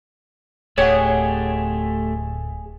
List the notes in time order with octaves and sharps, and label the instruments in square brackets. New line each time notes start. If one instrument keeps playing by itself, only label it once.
[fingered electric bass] D1 [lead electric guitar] A3 G4 [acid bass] G#4 [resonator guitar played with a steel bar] C#5 F#5